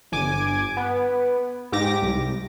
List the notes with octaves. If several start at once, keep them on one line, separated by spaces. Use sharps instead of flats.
G1 G#5 D6
B3
G#2 G4 D6 A#6
C2